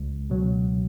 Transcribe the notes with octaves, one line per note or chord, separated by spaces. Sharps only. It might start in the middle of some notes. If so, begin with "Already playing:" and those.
Already playing: C#2
B2 F#3